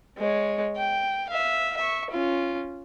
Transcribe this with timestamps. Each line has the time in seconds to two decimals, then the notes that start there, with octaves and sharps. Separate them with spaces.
0.17 G#3 C#5
0.77 G5
1.30 E5 F5
1.77 E5 C#6
2.10 C#4 F4